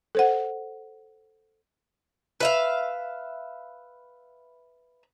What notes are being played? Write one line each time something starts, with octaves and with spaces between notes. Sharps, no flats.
A4 C5 F#5
B4 E5 F5